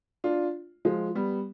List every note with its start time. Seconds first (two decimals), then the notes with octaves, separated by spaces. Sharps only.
0.24 D4 F4
0.85 F3 G#3
1.15 G3 B3